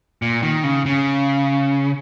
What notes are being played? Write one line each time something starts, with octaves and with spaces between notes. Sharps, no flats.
A#2
D#3
C#3
C#3